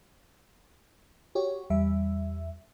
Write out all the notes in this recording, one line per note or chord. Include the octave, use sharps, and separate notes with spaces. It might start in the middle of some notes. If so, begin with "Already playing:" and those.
F#4 G4 C#5
E2 G3 E5